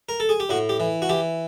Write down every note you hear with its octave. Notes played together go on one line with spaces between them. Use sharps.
A#4
A4
G#4
G4
A2 F#4
G4
E3
F#4
E3 G4